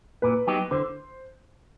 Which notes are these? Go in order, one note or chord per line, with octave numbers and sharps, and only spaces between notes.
A#2 B4
F#3 B3 D#4 G4
D3 C5